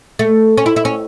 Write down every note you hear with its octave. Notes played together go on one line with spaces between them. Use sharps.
A3
C#4
E4
E4
C#4